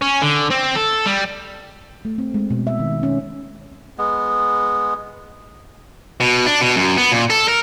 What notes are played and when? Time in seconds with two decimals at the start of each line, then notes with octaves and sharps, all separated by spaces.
0.02 C#4
0.22 D3
0.50 C4
0.75 A4
1.06 G3
2.05 A3
2.18 C4
2.34 G#3
2.50 B2
2.67 E5
2.79 D#3
3.03 C#4
3.98 G#3 B3
6.20 B2
6.46 D4
6.61 B2
6.76 F#2
6.97 B3
7.12 A#2
7.30 A4
7.48 A#4